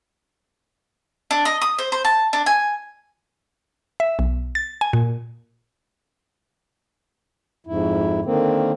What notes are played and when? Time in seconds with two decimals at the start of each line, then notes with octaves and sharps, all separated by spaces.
1.31 D4
1.45 D#5
1.61 D#6
1.79 C5
1.92 C5
2.05 A5
2.33 D4
2.46 G#5
4.00 E5
4.19 B1
4.55 A6
4.81 G#5
4.93 A#2
7.67 F2 G#2 E4
8.25 D3 D#3 A#3 C4